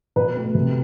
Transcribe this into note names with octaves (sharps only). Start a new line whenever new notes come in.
B2 B4
A3
C3